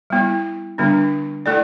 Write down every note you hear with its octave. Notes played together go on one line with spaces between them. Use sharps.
G3 B3 E4
D3 G3 B3 D4
A3 E4 A4 D5